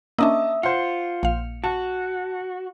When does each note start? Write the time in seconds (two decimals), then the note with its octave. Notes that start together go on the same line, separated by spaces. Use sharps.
0.19 A#3 C#4 D4 D#5 E5 A5 D#6 E6
0.63 F4 C5 F#5 C#7
1.23 A#1 F5
1.64 F#4 A5